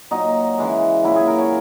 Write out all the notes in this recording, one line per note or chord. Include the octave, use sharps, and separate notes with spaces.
A#2 F#3 D#4
C#3 E3 G#3
A#2 F#3 E4
G#4
A#4
C#5